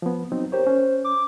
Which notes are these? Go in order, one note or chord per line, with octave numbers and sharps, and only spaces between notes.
F3 B3
F#3 C4 D#4
G4 A#4 C5 C#5
C#4
D6